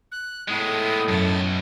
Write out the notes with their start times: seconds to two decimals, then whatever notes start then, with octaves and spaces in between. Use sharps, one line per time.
0.12 F#6
0.48 A2 G#3 B3 D#6
1.08 B1 F#2 B2 A5